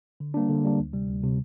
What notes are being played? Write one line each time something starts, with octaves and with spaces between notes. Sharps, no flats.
D3
G3 A#3 D4
D3
G3 A#3 D4
D2
C3 G3
D2
C3 G3